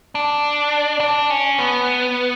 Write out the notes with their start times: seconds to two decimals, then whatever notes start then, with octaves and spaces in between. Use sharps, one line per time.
0.15 D4
1.00 D4
1.30 C#4
1.59 B3